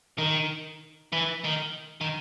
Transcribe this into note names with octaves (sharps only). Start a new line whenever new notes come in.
D#3
E3
D#3
D#3